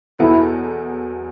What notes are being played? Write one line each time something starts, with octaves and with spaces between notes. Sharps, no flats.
E2 B2 F#3 B3 E4 A4